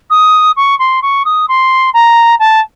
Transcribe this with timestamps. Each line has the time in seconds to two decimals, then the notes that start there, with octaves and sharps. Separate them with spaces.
0.10 D#6
0.56 C#6
0.79 C6
1.02 C#6
1.25 D#6
1.48 C6
1.93 A#5
2.39 A5